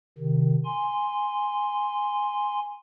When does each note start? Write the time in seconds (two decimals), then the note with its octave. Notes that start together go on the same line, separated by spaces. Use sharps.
0.18 C3 D#3
0.65 G#5 C6